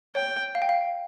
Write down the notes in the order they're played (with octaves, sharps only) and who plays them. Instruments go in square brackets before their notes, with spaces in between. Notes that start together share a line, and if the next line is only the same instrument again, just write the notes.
[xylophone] C#5 [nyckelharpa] G5
[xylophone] F5
G5
F5